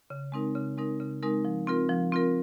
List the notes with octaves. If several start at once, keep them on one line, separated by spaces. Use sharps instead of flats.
C#3
G#3 C4 D#4 A#4
C#3
G#3 C4 D#4 A#4
C#3
G#3 C4 D#4 A#4
F3
C4 F4 A#4
F3
C4 F4 A#4